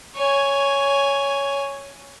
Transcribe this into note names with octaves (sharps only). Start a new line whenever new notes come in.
C#5 G#5